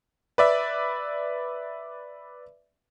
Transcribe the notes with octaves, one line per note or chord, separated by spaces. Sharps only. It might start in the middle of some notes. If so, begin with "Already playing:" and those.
B4 D5 E5